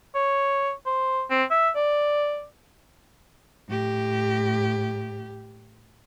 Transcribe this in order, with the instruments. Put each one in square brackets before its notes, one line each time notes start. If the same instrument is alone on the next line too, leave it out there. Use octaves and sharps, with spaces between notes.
[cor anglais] C#5
C5
C4
E5
D5
[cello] A2 G4